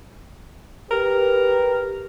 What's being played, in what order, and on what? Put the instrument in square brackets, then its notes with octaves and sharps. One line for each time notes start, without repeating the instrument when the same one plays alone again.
[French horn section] G4 B4 [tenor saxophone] A#4